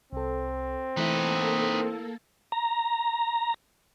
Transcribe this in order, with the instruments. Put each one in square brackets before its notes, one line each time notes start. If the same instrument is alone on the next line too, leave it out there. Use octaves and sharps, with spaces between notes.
[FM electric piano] C2 A4 [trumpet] C4
[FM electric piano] E3 A3 E4 [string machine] A#3 A4 [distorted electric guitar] D#4 B4
[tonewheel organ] A#5